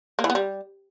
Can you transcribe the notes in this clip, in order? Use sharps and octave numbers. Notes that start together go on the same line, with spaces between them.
A#3
E3
B3
G3